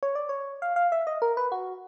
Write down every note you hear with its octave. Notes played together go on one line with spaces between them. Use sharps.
C#5
D5
C#5
F5
F5
E5
D#5
A#4
B4
F#4